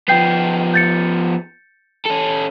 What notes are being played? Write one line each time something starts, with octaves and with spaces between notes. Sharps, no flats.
F3 B3 G5 G6 C7
G6 A6 C#7
C#4 A4